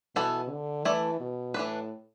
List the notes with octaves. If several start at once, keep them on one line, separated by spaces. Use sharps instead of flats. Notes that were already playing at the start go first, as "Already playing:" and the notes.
B2 E3 B3 E4 A4
D3
E3 A3 E4 D5
B2
A2 E3 D4 B4